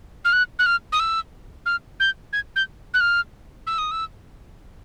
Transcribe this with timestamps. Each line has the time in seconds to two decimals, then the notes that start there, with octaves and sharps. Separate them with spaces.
0.25 F6
0.33 F#6
0.59 F#6
0.66 F6
0.92 D#6
1.00 E6
1.66 F6
2.00 G6
2.33 G#6
2.56 G6
2.94 F#6
3.01 F6
3.67 E6
3.78 D#6
3.91 E6